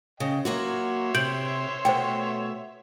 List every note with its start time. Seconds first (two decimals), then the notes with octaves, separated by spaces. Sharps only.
0.20 C#3 D#5 G5
0.45 F#3 A#3 F#4 C#5 E5 C6
1.15 C3 G6 D7 F#7
1.85 B2 A3 C5 G5